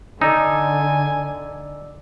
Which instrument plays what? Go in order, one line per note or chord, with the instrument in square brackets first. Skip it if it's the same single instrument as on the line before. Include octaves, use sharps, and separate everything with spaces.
[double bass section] D3 [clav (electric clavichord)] D#4 [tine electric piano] D5 E6 [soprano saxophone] G#5